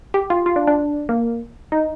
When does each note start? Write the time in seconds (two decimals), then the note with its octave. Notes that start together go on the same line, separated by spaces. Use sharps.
0.14 G4
0.30 F4
0.46 F4
0.56 D4
0.67 D4
1.09 A#3
1.72 D#4